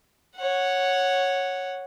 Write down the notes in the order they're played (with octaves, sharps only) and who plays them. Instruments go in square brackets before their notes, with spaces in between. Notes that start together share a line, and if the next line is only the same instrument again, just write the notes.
[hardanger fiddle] C#5 F#5